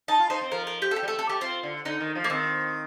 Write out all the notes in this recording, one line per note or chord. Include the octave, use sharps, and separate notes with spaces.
D#4 A5
F4
D#4 C5
C4
F3 A#4
A#4
G4
A4
G4
G3
A3 A4
A3 A4
A3 G4
C4 F4
D3
D3 D#4
D#3
F3
A#3
D#3 C4